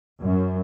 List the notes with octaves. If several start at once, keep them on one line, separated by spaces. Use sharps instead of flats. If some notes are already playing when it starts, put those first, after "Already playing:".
F#2